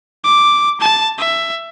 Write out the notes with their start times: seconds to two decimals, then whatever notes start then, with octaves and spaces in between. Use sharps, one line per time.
0.24 D6
0.80 A5
1.18 E5